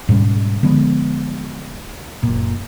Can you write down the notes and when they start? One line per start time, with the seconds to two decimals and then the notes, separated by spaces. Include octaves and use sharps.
0.09 G#2 B2 G3 C#4
0.63 D3 F3 G#3 B3
2.23 F#1 A#2